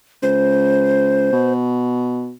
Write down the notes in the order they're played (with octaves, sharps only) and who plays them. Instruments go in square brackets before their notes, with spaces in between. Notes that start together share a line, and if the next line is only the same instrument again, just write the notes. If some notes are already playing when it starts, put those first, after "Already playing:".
[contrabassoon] C#2 [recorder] C5
[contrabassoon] B2